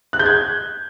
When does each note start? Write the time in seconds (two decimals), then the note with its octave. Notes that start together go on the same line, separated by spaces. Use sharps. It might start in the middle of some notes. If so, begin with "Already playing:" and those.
0.13 F#6
0.19 G6
0.26 G#6